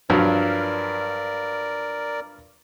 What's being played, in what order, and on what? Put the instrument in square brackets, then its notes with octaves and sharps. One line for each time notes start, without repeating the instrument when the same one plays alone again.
[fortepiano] G2 F3 F#3 [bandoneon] A#4 D5